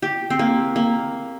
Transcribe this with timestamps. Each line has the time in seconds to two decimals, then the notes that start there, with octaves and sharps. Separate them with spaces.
0.02 G4
0.30 C4
0.39 A#3
0.76 A#3